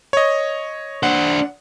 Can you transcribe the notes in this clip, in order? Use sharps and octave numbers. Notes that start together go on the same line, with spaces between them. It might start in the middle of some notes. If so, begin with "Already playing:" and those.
C#5 D#5
D4 C5 F#5